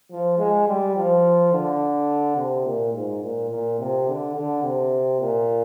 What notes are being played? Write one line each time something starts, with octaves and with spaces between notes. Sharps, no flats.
F3
G#3
G3
F3
D3
C3
A#2
G#2
A#2
A#2
C3
D3
D3
C3
A#2